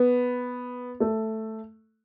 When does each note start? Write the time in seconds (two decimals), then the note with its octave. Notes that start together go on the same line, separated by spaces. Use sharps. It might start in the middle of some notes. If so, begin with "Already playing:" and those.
Already playing: B3
1.00 A3